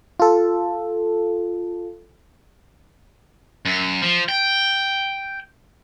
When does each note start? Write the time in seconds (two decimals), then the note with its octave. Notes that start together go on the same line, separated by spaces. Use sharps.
0.20 F4 A4
3.65 F#2
4.02 F3
4.29 G5